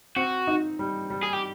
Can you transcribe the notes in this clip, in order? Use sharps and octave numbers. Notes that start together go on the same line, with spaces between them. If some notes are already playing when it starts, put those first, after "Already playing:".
C4 F#4
D#4
G3
G3
G#4
G4